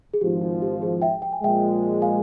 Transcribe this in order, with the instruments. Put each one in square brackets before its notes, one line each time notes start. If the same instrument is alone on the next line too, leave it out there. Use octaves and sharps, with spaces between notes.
[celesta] G#4
[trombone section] G#1 G#2 F3 [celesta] G4
[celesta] F4
G4
G#4
E5 G5
G5
G#5
[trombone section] A#2 F3 G#3 [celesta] E5 G5
[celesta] F5 G#5